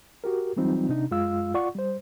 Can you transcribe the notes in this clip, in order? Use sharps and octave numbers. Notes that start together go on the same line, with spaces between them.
F#4 G4 A#4
E3 F#3 G3 C4 D#4 F4
C3 D4 D#4
F#2 G#3 F4 F5 E6
F4 D5 F#5 C#6
G3 C5